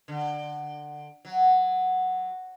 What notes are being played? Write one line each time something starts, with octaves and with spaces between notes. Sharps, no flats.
D3
F#3